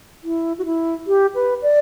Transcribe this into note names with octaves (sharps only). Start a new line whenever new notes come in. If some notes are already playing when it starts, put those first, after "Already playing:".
E4
F#4
E4
G4
B4
D5